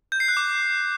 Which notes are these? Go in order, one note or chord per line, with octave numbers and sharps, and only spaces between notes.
G6
C7
F#6
D6